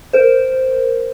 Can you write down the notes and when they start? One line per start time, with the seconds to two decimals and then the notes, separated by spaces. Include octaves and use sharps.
0.13 A#4 C5